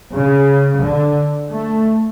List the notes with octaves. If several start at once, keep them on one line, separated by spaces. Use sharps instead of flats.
C#3
D3
A3